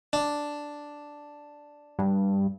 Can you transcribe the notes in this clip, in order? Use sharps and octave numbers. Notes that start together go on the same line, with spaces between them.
D4
G2